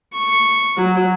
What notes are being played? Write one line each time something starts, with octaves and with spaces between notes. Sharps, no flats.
C#6
F#3